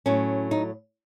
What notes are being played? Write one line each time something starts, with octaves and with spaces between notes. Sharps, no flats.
A2 F#3 C#4
D#4